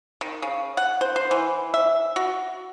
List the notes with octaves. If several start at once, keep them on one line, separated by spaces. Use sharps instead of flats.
D#3
C#3
F#5
C5
C5
E3
E5
F#4